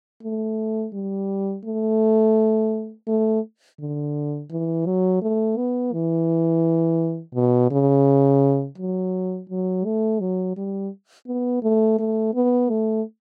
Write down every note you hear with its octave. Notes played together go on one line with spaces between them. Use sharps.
A3
G3
A3
A3
D3
E3
F#3
A3
B3
E3
B2
C#3
F#3
F#3
A3
F#3
G3
B3
A3
A3
B3
A3